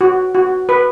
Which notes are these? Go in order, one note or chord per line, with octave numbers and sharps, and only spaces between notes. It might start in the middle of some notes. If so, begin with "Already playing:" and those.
F#4
F#4
B4